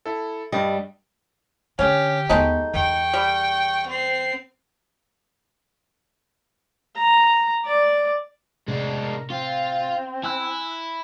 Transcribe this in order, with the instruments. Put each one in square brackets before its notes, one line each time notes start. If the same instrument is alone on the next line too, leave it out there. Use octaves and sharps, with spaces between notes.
[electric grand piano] E4 A4
[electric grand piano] G2 D#5 [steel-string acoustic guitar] G3
[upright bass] D3 [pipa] C#4 [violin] G4
[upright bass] D#2 B3 [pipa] G#3 A3 D#4
[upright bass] E2 [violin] G5 C#6
[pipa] G3
[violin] C4 C7
[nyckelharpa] A#5
D5
[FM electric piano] A2 C3 [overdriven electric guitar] G#3 D4
[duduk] A#4
[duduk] C4 [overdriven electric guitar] F4
[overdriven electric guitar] E4 [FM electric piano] G#5 E6 F#6